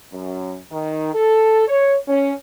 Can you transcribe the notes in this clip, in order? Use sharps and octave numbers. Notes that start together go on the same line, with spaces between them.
F#2
D#3
A4
C#5
C#4